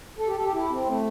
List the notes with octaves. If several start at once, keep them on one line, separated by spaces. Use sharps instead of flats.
A4
G4
A4
G4
E4
C4
A3